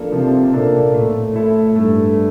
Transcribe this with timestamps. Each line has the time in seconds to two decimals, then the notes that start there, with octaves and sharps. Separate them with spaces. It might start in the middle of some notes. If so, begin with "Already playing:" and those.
Already playing: F3 A#3 D4 A4
0.12 C3 F3
0.53 A#2 A#3 D4 A4
0.94 A2 A3
1.35 E4 A4
1.76 G2 A3